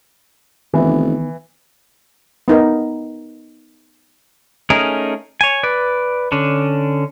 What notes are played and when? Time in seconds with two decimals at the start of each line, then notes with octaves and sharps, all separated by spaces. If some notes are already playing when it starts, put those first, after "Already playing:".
0.74 F1 D#3 E3 B3
2.48 B3 D#4 A#4
4.70 A3 C#4 D#4 G#4 A#4
5.41 C#5 G#5
5.63 B4 D5
6.32 D3 C#4 D4